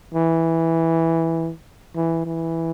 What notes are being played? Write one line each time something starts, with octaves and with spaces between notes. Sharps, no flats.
E3
E3
E3